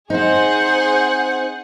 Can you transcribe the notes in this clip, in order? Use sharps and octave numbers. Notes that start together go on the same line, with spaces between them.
C4 D#4 G#4 C5 F#5